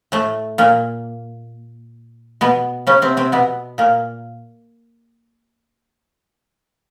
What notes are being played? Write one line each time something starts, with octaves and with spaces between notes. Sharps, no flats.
A2 A3
A#2 A#3
B2 B3
C#3 C#4
C3 C4
C3 C4
B2 B3
A#2 A#3